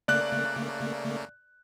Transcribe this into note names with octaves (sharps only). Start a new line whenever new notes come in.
C#3 A3 A#3 D5 F#6